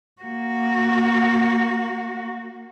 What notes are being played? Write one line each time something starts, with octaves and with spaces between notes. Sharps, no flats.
A#3 F#4